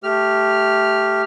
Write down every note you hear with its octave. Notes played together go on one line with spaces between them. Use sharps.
A3 G4 F6